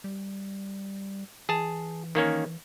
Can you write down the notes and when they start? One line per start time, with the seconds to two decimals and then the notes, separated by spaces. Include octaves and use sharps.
0.04 G3
1.49 E3 G#4 A5
2.15 D#3 A#3 C#4